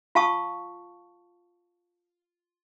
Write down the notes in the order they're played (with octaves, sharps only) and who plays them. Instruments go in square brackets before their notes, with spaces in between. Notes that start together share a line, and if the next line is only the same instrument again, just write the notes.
[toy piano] F4 F5 A5 C#6 D#6